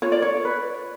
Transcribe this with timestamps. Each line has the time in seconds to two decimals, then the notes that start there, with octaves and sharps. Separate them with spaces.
0.02 F4 C#5
0.12 D5
0.22 C#5
0.45 B4